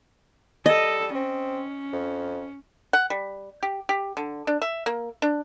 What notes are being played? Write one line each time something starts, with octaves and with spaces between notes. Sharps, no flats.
G3 A4 D#5
C4 C#4
F2
F#5
G3
G4
G4
D3
D4
E5
A#3
D4